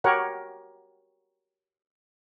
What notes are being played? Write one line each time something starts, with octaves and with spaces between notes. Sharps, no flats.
F#4 G4 A#4 C#5 F#5